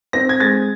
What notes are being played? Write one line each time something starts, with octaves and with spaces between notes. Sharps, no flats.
C4 A#6
G#6
G#3 A6